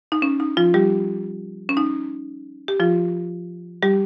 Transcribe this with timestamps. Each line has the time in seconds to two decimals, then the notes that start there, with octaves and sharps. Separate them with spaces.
0.12 D#4
0.22 C#4
0.40 D#4
0.57 F3 F4
0.74 G3 G4
1.69 C#4
1.77 D#4
2.68 G4
2.80 F3 F4
3.83 G3 G4